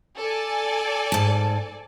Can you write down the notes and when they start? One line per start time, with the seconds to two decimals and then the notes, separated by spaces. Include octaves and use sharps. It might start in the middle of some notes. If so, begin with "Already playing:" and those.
0.18 A4 D5 G#5
1.12 G#2 A5